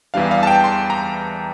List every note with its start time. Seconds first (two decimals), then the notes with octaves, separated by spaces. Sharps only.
0.14 E2 E3 G3 D4 F5
0.31 F5
0.43 A5
0.47 G5
0.64 C6
0.90 A#5